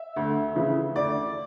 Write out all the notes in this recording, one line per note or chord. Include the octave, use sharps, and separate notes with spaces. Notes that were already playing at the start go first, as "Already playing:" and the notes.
Already playing: E5
D2
C#3 E3
D2 D5